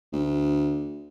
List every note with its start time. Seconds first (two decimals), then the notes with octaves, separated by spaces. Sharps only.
0.13 D2